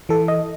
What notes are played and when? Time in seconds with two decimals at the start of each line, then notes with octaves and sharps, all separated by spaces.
0.09 E3 A4
0.28 D#5